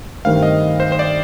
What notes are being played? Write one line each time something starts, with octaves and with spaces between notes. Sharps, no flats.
G2 D#3 A3 C4 F5
D#5
C5
C5
D5